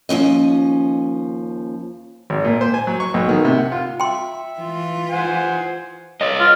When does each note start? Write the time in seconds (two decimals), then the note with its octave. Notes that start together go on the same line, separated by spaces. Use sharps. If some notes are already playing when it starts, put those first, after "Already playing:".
0.09 D#2 F3 C#4 D#5
2.30 G#1
2.45 A#2
2.61 C5
2.74 G#5
2.87 F#3
3.00 C#6
3.14 B1
3.29 D#3
3.45 C3
3.58 F#5
3.72 F4
4.00 E5 G5 C6
4.60 E3 F4
5.10 C5 F#5 G#5
6.21 C#5 D#5
6.40 F4